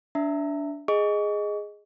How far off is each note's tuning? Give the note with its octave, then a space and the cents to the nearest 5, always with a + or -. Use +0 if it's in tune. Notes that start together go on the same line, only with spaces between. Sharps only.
D4 -20 E5 +0 A#5 -30
G#4 +0 D#5 +0 C#6 +35